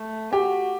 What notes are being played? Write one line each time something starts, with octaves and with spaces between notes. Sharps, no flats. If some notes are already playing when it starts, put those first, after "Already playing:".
Already playing: A3
F#4 G4